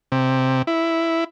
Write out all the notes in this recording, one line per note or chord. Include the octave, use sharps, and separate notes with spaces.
C3
E4